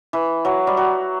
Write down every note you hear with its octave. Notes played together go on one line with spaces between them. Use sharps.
E3
F#3
G3
F#3